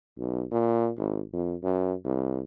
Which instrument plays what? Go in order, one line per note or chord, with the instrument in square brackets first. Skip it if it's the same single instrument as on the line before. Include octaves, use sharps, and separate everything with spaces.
[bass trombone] B1
A#2
G#1
F2
F#2
C2